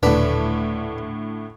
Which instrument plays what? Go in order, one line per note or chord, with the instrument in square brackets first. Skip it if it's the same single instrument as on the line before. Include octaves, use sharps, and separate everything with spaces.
[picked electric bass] D#1 [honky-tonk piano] A2 D3 [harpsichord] D4 B4